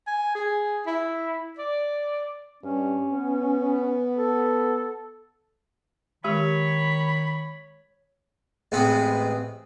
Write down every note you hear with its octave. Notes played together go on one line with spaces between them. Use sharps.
G#5
G#4
E4
D5
G2 C#4
B3
A4
D#3 G#3 G4 C#5 B5
A1 G#3 B3 C4 B5